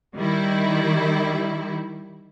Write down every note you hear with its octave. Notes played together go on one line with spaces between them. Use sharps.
D#3 G3 E4